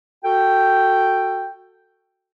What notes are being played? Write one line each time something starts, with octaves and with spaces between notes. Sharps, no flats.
F#4 A4 G5